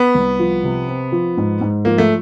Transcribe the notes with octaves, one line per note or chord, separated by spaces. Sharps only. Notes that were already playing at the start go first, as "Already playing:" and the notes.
Already playing: B3
C2
F3
C3
C4
F3
G#2
G#2
F3 A#3
A3